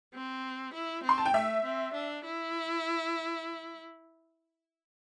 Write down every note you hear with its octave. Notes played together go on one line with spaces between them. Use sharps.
C4
E4
C4
C6
A5
G5
A3 E5
C4
D4
E4